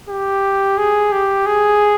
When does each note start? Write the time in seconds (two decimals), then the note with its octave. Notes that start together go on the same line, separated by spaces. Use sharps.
0.09 G4
0.78 G#4
1.12 G4
1.46 G#4